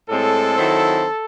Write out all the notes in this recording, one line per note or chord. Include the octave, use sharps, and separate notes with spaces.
A2 G#3 C4 A4
D#3 F#3 C4 E4